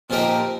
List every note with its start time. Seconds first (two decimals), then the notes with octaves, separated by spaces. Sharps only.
0.10 A#2 F3 D#4 G4 A#4 C5